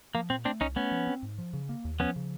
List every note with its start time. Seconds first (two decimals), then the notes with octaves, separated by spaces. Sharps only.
0.14 F3 A#3
0.30 A#2 C4
0.45 A3 C4 D4
0.61 C2 C#4 D#4
0.76 A3 B3 C#4
0.92 F3
1.07 C4
1.23 G#2
1.38 F3
1.53 C#3
1.69 A#3
1.85 D#2
1.99 F3 B3 C#4
2.16 C#3